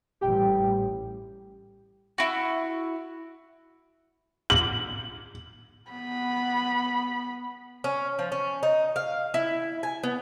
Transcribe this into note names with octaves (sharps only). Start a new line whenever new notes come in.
A1 G3 G4 G5
E4 F#4
F#7
B3 B5
C#4
F3
C#4
D#4
F5
E4
G#5
B3